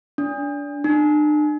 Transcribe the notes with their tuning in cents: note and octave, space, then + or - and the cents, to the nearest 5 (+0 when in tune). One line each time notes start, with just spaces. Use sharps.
D4 -25
D4 +40